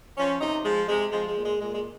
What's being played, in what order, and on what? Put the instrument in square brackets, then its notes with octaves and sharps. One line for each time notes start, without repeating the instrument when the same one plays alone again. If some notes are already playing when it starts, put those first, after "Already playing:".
[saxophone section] F3 C#4
C3 D#4
F3 G#3
C3 G#3
F3 G#3
G#3
A#2
G#3
A#2 G#3
G#3